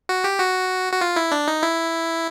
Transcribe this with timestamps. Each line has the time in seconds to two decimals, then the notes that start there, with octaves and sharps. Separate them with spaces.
0.09 F#4
0.24 G4
0.40 F#4
0.93 F#4
1.01 F4
1.16 E4
1.32 D4
1.48 D#4
1.63 E4